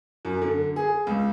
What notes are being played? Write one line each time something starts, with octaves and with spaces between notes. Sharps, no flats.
F#2
D3
G#4
C#2